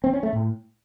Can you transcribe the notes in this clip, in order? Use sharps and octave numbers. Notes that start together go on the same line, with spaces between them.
C4
C#4
A3
A2